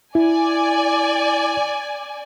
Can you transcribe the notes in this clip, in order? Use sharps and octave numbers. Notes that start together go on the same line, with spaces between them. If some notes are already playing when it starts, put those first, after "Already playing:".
E4 D5 G#5